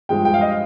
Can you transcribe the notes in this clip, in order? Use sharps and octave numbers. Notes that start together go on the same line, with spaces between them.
G2 F3 G#3 G5
G5
F5
D#5